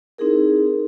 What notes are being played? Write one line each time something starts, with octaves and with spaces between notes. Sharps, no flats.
C4 D#4 E4 G#4 A#4